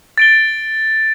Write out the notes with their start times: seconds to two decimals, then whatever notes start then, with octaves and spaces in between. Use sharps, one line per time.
0.18 A6 D7 G7